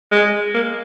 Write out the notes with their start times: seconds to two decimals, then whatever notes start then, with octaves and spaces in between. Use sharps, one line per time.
0.12 G#3
0.54 A#3